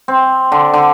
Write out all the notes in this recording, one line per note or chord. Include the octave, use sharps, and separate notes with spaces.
C4
D3
D3